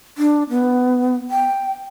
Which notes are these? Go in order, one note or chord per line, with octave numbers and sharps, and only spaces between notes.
D4
B3
G5